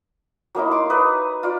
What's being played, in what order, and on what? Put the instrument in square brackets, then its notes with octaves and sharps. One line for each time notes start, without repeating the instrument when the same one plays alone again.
[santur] F#3 A#3 D#4 E4
C6 D6
D#4 B4 D#5
F4 D5